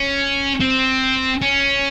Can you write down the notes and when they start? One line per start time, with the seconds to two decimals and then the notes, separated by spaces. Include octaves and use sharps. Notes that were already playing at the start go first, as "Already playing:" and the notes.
Already playing: C#4
0.60 C4
1.42 C#4